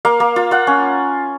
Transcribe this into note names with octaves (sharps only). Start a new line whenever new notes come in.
A#3 F5
A#3
F4
F4 F#5
C#4